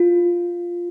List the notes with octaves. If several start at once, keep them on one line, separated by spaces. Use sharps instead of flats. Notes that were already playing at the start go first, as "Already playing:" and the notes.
Already playing: F4